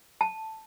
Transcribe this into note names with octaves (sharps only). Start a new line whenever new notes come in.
A5